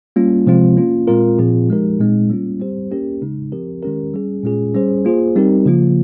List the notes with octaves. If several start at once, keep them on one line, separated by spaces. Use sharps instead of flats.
G3 A#3 C#4 F4
C3 F3 G#3 C4 F4
A#3 C#4 F4
A#2 G#3 C4 F4 A#4
A#2 F3 C4 F4 G#4
F3 G#3 D#4 G4 A#4
A#2 G#3 C4 D#4
G3 A#3 C#4 F4
G3 C4 G4 C5
A#3 C#4 G4 A#4
C#3 G#3 D#4
F3 C4 G4 A#4
D#3 G#3 C#4 G4 A#4
G3 C#4 G#4
A#2 G#3 C#4 F4 G#4
G3 C#4 G#4 C5
A#3 F4 G#4 C5
G3 C4 D#4 G4 A#4
C#3 F3 A#3 F4